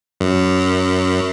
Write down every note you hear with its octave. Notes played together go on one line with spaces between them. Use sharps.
F#2